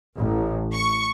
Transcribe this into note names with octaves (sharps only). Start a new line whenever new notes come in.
A1
C#6